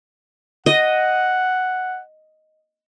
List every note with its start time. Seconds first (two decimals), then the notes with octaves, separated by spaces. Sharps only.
0.66 D#5 F#5